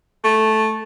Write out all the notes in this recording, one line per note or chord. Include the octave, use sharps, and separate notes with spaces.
A3